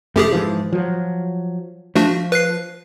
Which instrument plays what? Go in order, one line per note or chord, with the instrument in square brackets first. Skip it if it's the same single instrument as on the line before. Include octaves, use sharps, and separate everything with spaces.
[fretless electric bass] F1 A3 [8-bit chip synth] F#2 G4 G#4
[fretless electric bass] G#2 E3 F3
F3 F#3
[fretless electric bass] F3 [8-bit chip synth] A3 D4 F#4
[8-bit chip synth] B4 F#6 C7